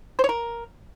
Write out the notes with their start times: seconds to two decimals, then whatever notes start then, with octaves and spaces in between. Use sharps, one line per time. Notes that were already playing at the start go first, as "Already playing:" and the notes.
0.19 C5
0.24 C#5
0.29 A#4